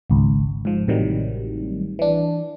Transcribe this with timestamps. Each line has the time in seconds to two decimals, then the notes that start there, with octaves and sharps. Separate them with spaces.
0.10 G#1 C#2
0.65 G#2 F3
0.87 A1 A2 C3 D#3 F#3 G3
1.99 E3 D4